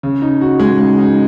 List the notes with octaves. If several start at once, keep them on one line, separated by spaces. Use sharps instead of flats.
C#3
D#4
F#4
G#3
C#3
D#4